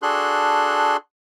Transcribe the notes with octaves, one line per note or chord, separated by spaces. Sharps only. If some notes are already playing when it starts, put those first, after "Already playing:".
D4 F#4 G#4 A4 C6 F#6